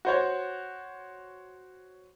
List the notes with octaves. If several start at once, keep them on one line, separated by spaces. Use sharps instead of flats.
F#4 C5 C#5